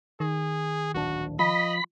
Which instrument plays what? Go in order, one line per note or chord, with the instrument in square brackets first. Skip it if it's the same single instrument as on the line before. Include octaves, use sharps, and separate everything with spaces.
[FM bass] D#3 [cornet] G#4
[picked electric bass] D1 A#1 D4 [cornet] F#4
[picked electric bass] F3 [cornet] D#5 [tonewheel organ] B5